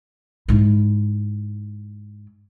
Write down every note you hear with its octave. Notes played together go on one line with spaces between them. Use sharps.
G#2 E4